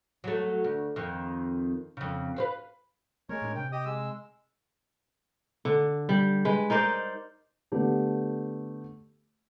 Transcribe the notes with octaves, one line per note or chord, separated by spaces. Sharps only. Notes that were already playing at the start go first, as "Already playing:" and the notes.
F#3 A3
D2
F2 D#3
F2 C#3
B4 C5 F5
G#3 A3 A#4 C#5
A2 D4
C3 G5
G4 D#5 D#6
G#3 E6
D3
G3
G#3 B4
D#4 A#4 C5 D5
D3 A3 B3 G4